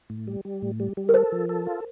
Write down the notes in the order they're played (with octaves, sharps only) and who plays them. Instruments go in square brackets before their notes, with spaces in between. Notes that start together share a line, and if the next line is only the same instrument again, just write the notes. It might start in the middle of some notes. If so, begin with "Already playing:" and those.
[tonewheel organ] A2
G3
G3
A2
G3
G3
[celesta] A#4
[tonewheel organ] A4 [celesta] C5
[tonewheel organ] F3
A4
F4